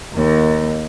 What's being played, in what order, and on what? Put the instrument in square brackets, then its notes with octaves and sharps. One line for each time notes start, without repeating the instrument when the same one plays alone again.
[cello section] D#2